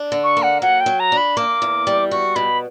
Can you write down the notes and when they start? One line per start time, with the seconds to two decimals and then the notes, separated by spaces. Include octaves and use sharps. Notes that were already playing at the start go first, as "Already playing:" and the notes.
Already playing: D4
0.12 D3
0.24 C#6
0.37 A#3
0.43 F#5
0.62 F#3 F#5
0.81 G5
0.86 F#3
1.00 A#5
1.12 D4
1.17 B5
1.37 A#3 D6
1.62 E2
1.87 G3
2.11 F#4 C#6
2.36 B2 B5